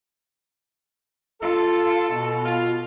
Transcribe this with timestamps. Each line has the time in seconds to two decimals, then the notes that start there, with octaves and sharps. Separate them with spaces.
1.41 F4 A4
2.12 B2
2.46 F4